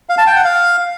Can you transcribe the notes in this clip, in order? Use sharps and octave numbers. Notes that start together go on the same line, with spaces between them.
F5
A5
G5
F#5
F5